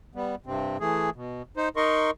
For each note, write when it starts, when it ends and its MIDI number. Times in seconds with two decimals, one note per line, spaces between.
0.15 0.35 55
0.15 0.35 59
0.46 0.77 43
0.46 0.77 48
0.46 0.77 60
0.80 1.10 52
0.80 1.10 57
0.80 1.10 68
1.16 1.42 47
1.57 1.69 63
1.57 1.69 72
1.76 2.11 63
1.76 2.11 70
1.76 2.11 75
1.76 2.11 84
1.76 2.11 85